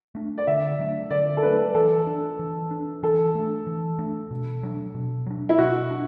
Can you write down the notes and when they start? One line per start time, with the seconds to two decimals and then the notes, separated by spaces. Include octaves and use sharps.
0.15 A3 D4
0.38 D5
0.47 D3 E5
0.79 F#3 A3 D4
1.11 D3 D5
1.37 A4
1.42 F#3 A3 D4 B4
1.75 E3 A4
2.07 D4
2.39 E3
2.71 D4
3.03 E3 A4
3.35 A3 D4
3.67 E3
3.99 A3 D4
4.31 B2
4.63 F#3 D4
4.95 B2
5.26 F#3 D4
5.49 E4
5.58 B2 F#4
5.91 D4